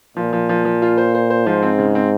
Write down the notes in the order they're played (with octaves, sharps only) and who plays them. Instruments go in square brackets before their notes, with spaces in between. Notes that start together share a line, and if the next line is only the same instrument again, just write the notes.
[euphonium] A#2 [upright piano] F3
[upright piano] F3
F3
F3
F4
C5
C5
C5
[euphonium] G#2 [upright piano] F3
[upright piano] C4
C#3
C4